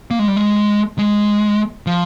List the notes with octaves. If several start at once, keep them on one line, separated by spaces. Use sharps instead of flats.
A#3
G#3
G3
G#3
G#3
F3